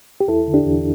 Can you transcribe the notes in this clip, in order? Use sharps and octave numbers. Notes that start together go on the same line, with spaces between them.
G4
E2 E4 A4
D3
D4 G4
E2